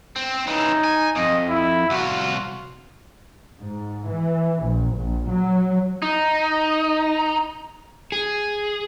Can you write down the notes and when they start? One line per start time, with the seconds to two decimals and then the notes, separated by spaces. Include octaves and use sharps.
0.16 C4
0.47 C#3 E3 D#4
0.84 G#5
1.15 F2 D#5
1.50 E4
1.90 C2 F4 F#4
3.60 G#2
4.09 E3
4.63 A#1
4.95 A#1
5.30 F#3
6.02 D#4
8.12 G#4